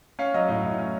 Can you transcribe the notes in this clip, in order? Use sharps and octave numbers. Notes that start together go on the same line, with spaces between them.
C#4 F5
F#3 D#5
A2 D#5
A2
C#4